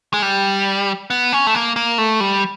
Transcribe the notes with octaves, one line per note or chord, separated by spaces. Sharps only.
G#3
G3
B3
C#4
A3
A#3
A#3
A3
G3